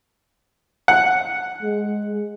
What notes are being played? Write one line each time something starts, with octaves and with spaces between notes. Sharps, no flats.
F#5
G#3